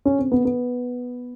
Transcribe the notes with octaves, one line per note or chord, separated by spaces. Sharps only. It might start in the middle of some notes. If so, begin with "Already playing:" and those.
C#4
C4
B3
B3